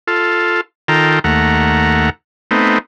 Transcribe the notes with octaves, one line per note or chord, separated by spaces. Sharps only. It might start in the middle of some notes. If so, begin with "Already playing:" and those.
F4 A4
D#3 F4 A4 G5 A#5
D#2 A3 F#5 A#5
A3 B3 C4 D#4